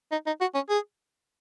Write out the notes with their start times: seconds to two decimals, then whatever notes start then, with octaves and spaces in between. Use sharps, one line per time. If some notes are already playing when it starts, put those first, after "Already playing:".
0.12 D#4
0.27 D#4
0.41 F#4
0.55 C#4
0.69 G#4